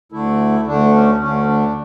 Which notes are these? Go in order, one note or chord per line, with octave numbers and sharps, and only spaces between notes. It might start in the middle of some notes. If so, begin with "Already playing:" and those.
D2 D3 A3 E4
D2 D3 A3 D4
C#4
D2 D3 A3 C#4
D4